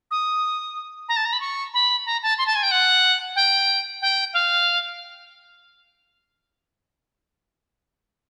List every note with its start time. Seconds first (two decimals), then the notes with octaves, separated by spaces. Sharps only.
0.10 D#6
1.08 A#5
1.16 A5
1.25 A#5
1.32 B5
1.40 C#6
1.73 B5
2.06 A#5
2.22 A5
2.38 C6
2.46 A5
2.55 G#5
2.62 G5
2.71 F#5
3.35 G5
4.01 G5
4.33 F5